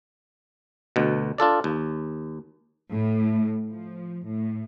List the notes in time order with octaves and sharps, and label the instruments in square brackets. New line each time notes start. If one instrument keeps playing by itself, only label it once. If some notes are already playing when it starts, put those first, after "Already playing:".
[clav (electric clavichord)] D2 B2
D4 F4 A4 D5
D#2
[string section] A2
F3
A2